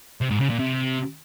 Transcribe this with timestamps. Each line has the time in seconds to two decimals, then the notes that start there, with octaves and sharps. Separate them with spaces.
0.21 C3
0.30 G#2
0.40 C#3
0.49 A#2
0.59 C3